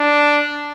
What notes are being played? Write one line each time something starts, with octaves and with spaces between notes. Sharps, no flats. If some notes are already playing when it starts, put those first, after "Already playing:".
Already playing: D4